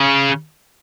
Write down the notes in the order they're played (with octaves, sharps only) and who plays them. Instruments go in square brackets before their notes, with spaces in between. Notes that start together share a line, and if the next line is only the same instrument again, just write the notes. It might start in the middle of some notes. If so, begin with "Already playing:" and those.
Already playing: [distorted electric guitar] C#3